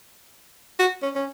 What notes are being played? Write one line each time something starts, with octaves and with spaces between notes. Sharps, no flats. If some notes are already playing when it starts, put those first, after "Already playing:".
F#4
C#4
C#4